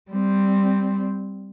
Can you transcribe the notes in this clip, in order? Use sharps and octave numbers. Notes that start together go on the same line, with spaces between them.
G3 C4